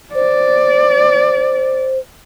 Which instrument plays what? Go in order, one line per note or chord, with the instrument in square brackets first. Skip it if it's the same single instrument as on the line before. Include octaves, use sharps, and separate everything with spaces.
[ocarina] C5 [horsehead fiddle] D5